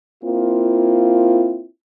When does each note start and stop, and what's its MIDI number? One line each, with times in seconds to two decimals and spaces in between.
0.23 1.66 58
0.23 1.66 60
0.23 1.66 64
0.23 1.66 65